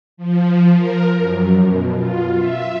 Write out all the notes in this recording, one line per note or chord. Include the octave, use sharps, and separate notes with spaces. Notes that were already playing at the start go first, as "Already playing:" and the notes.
F3
A#4
F#2
B2
F4
E5